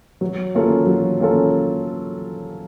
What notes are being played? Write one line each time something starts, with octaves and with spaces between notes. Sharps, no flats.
F#3
A#3 C#4 F4 A4
F#3
A#3 C#4 F4 A4